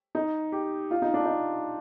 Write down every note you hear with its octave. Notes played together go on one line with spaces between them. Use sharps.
D#4
G4
F4
D#4
D4
D#4